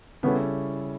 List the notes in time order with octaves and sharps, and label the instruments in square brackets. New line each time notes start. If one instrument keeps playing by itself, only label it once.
[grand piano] C#3 G3 C#4 E4 A4 [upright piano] B3